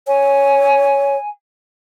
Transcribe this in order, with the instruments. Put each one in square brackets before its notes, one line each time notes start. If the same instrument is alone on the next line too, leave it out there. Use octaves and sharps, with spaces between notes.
[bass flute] C#5 [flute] G#5